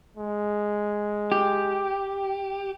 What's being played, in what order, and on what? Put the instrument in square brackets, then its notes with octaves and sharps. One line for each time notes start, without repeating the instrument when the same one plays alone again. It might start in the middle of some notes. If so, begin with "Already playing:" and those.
[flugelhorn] G#3
[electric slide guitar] G4